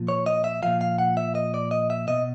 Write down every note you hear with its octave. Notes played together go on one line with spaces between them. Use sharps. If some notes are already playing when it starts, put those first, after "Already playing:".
Already playing: A#2 F3
C#5
D#5
E5
A#2 F3 F5
F5
F#5
E5
D#5
D5
D#5
E5
B2 D#5